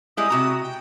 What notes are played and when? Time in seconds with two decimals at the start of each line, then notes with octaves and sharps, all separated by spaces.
0.17 G3 G#3 E4 D#6
0.30 C3 F#4 A#5
0.63 G5